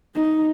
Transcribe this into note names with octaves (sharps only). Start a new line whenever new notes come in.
D#4